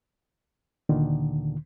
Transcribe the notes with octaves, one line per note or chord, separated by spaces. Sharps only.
D2 A#2 D3 D#3